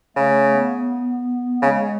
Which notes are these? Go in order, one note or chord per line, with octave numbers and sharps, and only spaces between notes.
C#3 A3
B3
C#3 G#3